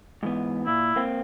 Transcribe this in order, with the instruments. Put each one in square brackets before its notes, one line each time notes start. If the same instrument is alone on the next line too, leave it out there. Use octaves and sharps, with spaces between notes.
[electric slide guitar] G#2 E3 B3
[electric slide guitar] A#2 [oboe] E4
[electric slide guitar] A#3 C4